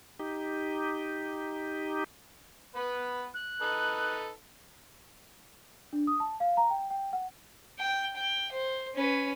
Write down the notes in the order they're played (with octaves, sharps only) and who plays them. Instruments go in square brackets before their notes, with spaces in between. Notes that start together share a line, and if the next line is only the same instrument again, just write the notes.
[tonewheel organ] D#4 G4
[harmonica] B3 B4
[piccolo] F#6
[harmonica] D#4 A4 B4
[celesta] D4
D#6
A5
F5
A#5
G5
G5
F#5
[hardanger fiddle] G5
G5
C5
C#4 B4